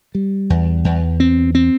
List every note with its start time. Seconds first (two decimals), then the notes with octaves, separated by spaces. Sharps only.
0.15 G3
0.50 E2
0.85 E2
1.20 C4
1.55 C4